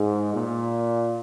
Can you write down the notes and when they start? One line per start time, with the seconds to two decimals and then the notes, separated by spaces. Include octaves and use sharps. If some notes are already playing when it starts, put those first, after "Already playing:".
Already playing: G#2
0.34 A#2